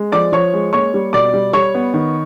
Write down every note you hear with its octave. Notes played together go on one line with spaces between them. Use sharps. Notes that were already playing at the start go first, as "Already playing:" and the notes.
Already playing: G#3
F3 D5 D6
F3 C#5 C#6
G#3
A#3 C#5 C#6
G3
B2 D5 D6
G3
G3 C#5 C#6
B3
D#3